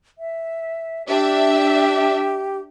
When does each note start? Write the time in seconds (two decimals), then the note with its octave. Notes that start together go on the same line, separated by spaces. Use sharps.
0.18 E5
1.08 D4 G4 E5